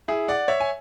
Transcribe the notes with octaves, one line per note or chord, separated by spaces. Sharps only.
E4 G#4
D5 F#5
C#5 E5
G#5